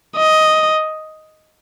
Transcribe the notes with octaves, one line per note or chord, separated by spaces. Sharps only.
D#5